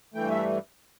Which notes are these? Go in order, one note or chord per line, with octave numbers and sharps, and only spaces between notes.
G2 E3 A3 G5
E5